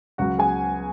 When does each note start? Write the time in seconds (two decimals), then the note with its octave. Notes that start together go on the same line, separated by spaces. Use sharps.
0.18 C#2 C#3 F#3 F#4 F#5
0.38 G#4 G#5